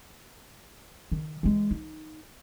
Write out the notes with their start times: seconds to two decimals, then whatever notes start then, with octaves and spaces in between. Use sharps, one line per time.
1.12 D#3
1.43 E3 G#3
1.71 D#4